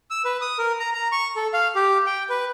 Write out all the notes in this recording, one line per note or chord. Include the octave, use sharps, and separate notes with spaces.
E6
B4
D#6
A#4
A#5
A#5
C#6
A4
F5
G4
G5
B4